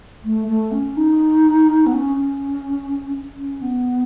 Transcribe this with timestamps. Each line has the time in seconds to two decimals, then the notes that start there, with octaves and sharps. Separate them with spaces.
0.25 A3
0.48 A3
0.72 C#4
0.97 D#4
1.87 B3
1.93 C#4
2.17 C#4
3.37 C#4
3.62 B3